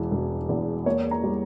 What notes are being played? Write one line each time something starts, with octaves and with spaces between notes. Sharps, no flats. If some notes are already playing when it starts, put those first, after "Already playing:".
Already playing: E1 E3
E1
E2
A#3 C#5
A#5
G3